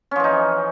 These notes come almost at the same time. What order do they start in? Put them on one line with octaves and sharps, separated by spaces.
C#4 F3 E3 D#4